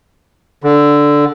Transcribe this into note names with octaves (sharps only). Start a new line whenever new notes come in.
D3